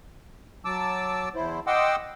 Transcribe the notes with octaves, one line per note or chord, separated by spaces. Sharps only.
F#3 A5 D6 E6
E2 E4 C5
D#5 F#5 G5 C6 D6 E6